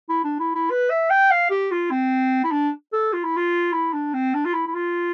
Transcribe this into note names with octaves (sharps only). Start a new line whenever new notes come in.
E4
D4
E4
E4
B4
E5
G5
F5
G4
F4
C4
E4
D4
A4
F4
E4
F4
E4
D4
C4
D4
F4
E4
E4
F4